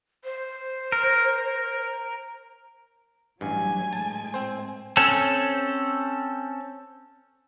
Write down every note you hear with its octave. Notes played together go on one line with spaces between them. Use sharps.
C5
A#4
A1 G2 F#3 G#5
A2 G#3 A5
C4 C5
C4 C#4 A4